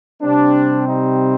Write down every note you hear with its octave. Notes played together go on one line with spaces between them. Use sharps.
C3 G3 C4 D4
D#4